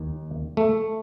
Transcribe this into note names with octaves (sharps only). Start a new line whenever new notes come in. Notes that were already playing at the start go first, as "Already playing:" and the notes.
Already playing: D#2 D#3
A3